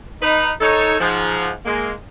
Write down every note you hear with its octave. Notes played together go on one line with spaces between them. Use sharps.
D#4 B4
D#4 A4 C#5
G#2 F3
G#3 A#3